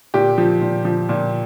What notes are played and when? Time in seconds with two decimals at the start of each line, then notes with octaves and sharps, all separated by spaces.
0.14 A#2 G4
0.38 F3
0.61 A#2
0.85 F3
1.09 A#2